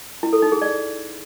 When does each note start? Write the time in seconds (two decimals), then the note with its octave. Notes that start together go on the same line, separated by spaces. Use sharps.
0.23 E4
0.33 A4
0.42 D#4
0.52 G#4
0.62 D5